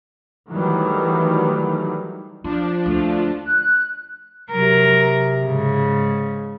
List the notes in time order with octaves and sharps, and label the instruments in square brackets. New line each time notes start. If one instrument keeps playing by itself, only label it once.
[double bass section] D#3 E3 F#3 G3 A3
[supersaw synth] F3 D4 [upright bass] F4
[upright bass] D2 [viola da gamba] A3 F4
[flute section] F#6
[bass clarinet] C3 [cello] F#3 A#4
[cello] G#2 C#3